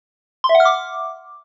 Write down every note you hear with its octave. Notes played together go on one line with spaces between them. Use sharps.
C6
E5
F#5
F6
D6